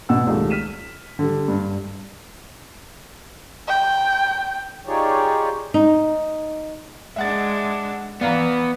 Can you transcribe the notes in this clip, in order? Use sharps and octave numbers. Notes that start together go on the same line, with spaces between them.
B2 F#5 E6
C#2 D#3 G3 A3
F6 B6 D#7 E7
D3 G3
G2
G5
D#4 F4 G4 G#4 C#5 D5
D#4
G#3 D4 E5 F#5 A6
E3 B3 D5 F5 A#5